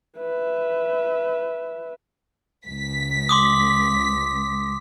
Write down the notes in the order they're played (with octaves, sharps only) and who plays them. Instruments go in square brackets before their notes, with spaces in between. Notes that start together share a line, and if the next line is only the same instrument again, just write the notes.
[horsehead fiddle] B4 E5
[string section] C#2 B6
[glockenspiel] C6 D6 D#6